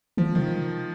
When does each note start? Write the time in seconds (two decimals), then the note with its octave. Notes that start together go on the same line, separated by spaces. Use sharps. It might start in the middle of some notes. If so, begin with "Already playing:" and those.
0.17 D#3 F3
0.35 C3 D#3